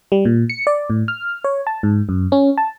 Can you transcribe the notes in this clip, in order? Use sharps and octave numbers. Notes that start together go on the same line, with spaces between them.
G3
A#2
C#7
D5
A2
F6
C#5
A5
G#2
F#2
C#4
A5